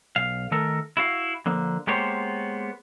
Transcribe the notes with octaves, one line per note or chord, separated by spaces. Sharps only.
B1 F5
D#3 A3 A4 A#4
E4 F#4 F5
D3 F3 A#3
G#3 A#3 B3 G4 C5 C#5